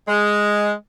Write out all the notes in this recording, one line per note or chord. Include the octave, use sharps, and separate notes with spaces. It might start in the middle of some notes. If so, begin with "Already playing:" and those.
G#3